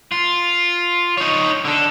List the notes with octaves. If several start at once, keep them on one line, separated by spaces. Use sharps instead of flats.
F4
D#4 C#5
D3 A4